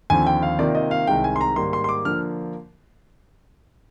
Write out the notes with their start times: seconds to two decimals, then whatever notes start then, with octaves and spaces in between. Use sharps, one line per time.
0.10 D#2 D3 F3 C4 G#5
0.27 G5
0.42 F5
0.59 C3 D#3 A#3 F4 D5
0.75 D#5
0.91 F5
1.07 C2 C3 D#3 G#3 G5
1.24 G#5
1.36 C6
1.41 A#5
1.56 G#2 D#3 G3 A#3 C6
1.73 C6
1.84 C6
1.89 D6
2.05 D3 F3 A#3 F6